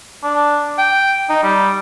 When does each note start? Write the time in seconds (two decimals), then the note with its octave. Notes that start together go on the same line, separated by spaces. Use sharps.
0.23 D4
0.78 G5
1.29 D#4
1.43 G3